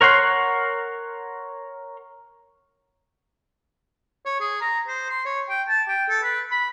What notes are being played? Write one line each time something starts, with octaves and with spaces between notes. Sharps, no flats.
A#4 C#5 F#5 C6
C#5
G#4
A#5
C5
C6
C#5
G5
A5
G5
A4
B4
B5